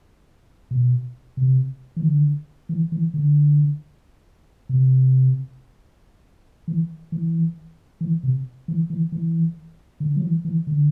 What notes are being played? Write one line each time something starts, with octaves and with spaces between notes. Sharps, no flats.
B2
C3
E3
D3
E3
E3
D3
C3
E3
E3
E3
C3
E3
E3
E3
D3
F#3
E3
E3
D3